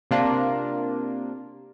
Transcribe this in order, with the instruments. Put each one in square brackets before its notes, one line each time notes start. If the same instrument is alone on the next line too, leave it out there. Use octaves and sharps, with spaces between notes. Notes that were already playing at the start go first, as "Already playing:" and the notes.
[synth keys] C3 A#3 D4 F4